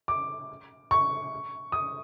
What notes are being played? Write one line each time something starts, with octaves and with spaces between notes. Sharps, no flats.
D6
C#6
D#6